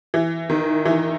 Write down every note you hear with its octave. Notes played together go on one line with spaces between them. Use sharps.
E3
D#3
E3